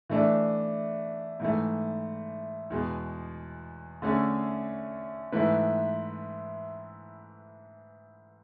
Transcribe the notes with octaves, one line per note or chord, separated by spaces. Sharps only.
E3 A3 D4
G#2 E3 A3
E2 B2 G#3
D3 A3 C#4 G#4
G#2 E3 A3 E4 B4